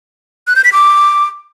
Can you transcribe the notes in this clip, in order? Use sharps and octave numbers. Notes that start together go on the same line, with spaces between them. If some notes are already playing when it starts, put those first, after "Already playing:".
F#6
G6
B6
D6